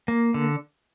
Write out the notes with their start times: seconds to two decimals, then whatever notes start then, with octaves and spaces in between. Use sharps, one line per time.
0.08 A#3
0.34 D3